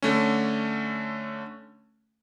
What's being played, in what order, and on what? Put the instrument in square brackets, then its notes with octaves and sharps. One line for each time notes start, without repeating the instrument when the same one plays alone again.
[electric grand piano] D3 A3 C#4